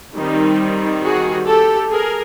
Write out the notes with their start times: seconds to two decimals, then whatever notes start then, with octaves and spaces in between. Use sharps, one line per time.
0.15 D#3 G3 C4 D#4
1.03 F#4 G#4
1.46 G4 A4
1.90 G#4 A#4